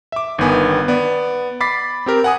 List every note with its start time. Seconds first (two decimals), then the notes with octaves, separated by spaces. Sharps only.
0.12 E5 D6
0.38 G1 D#3 B3 G#5
0.88 B3 D5
1.61 B5 D6 A6 B6 C7
2.06 C4 G4 A#4
2.24 F#5 G#5 D#6